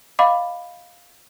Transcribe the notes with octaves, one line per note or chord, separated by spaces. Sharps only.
D#5 F5 B5 D6